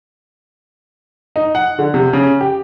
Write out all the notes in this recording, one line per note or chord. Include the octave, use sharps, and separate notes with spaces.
D#4
F#5
D3
C3
C#3
G4